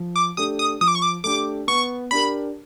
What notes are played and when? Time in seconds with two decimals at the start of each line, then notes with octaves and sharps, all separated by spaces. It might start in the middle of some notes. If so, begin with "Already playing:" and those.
Already playing: F3
0.16 D6
0.37 A3 D4 G4 D#6
0.59 D#6
0.81 F3 D#6
0.88 D6
0.95 C#6
1.02 D6
1.24 A3 D4 G4 D6
1.67 B3 C#6
2.11 D4 G4 A#4 B5